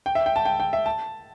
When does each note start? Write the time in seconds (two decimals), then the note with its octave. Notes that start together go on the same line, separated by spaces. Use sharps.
0.06 G5
0.15 E5
0.26 G5
0.36 A5
0.45 G5
0.60 G5
0.73 E5
0.86 A5